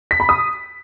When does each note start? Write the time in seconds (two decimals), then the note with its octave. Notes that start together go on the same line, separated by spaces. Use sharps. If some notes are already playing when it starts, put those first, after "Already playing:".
0.11 B6
0.20 B5
0.29 D#6